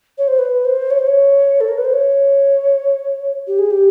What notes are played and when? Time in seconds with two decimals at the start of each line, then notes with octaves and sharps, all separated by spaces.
0.18 C#5
0.28 C5
0.39 B4
0.65 C5
0.91 C#5
0.99 C5
1.07 C#5
1.61 A4
1.68 A#4
1.78 B4
1.85 C5
1.93 C#5
3.47 G4
3.59 G#4
3.71 G4